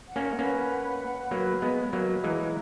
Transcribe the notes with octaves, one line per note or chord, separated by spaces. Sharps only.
F#5
A#3 C#4
A#3 C#4 B4
F#5
B4
F#3 A#3 B4
G#3 B3 B4
F#3 A#3 B4
E3 G#3 A#5